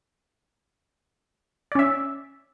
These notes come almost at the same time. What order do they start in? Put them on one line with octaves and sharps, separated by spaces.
D5 C#4 E5